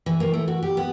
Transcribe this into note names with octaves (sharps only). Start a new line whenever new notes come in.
E3
A#3
A3
F#4
G4
B3